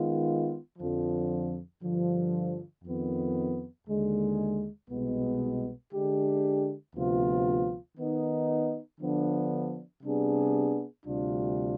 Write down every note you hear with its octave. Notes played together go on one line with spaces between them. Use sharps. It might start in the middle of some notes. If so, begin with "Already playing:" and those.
Already playing: D#3 G#3 B3 F4
F2 D3 F3
G2 D3 F3
F2 D#3 B3
D#2 D3 G#3
C2 B2 G#3 B3
D3 G#3 D4 G4
D2 C3 F3 B3 F4
D#3 B3 D#4
D3 F3 B3 D4
C3 G3 B3 D4 G#4
D2 C3 G3 D4 F4